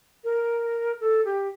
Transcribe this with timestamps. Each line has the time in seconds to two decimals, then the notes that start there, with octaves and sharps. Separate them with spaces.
0.24 A#4
1.00 A4
1.25 G4